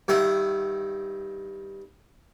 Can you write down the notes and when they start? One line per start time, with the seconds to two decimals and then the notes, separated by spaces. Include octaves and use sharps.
0.08 G2 D#3 E5 F#5